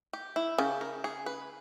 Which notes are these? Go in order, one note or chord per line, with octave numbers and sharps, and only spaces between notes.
G4
E4
C#3 G4
A#4
G#4
B4